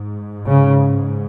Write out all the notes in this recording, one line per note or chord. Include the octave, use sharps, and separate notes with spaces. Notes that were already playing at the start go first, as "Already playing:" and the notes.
Already playing: G#2
C#3